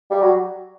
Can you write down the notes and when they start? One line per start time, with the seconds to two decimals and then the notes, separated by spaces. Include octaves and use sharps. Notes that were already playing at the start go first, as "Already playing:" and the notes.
0.11 G3
0.22 F#3